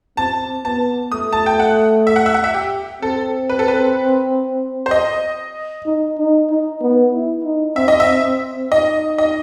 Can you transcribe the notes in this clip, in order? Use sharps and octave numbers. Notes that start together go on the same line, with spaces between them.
C4 A5
B3 A5
A3 D#6
A5
G5
F#5
E5
F#5
E5
F#5
E5
G4
C4 A4
B4
A4
B4
C5
D#5
D#4
D#4
D#4
B3
E4
D#4
C4 E5
D#5
E5
C4
D#4 D#5
D#5